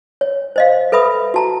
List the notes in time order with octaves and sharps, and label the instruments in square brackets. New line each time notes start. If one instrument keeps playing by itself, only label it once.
[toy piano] C#5
C5 D#5 F5
A4 B4 E5 B5 D#6
F#4 A5 A#5